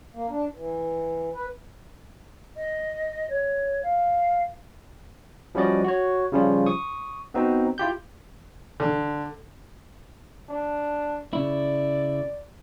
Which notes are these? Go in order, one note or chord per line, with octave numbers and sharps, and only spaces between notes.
A#3
D4
E3
B4
D#5
C#5
F5
F3 G3 C#4 F#4 D5 D#5
F#4 C#5
C#3 F3 G3 C#4 F4
C#6 D#6
B3 C4 D#4 F#4
E4 F4 G4 G6
D3
D4
C#3 E4 D5